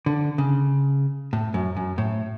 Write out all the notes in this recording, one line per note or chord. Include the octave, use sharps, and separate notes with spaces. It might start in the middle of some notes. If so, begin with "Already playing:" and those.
D3
C#3
A2
F#2
F#2
A2